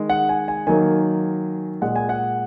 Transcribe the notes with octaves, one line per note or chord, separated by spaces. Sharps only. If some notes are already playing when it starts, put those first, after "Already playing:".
Already playing: D#3 G#3
F#5
G#5
G#5
D#3 F#3 A#3 G#5
A#2 G#3 F#5
G#5
F#5